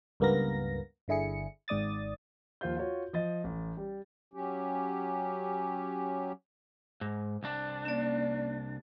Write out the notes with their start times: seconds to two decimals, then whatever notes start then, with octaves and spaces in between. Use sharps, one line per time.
0.20 C#2 G2 A#3 B3 A#4 A#6
1.08 G1 D3 E4 G#4 C#7
1.68 G#1 G#2 D5 D#6 A6
2.61 D#2 F3 F4 C5 G6
2.76 F4 F#4 C#5
3.13 F3 D#5 A6
3.44 A1
3.77 G3
4.34 F#3 C#4 G4
7.01 G#2
7.43 C2 D4
7.85 A#3 C#4 D5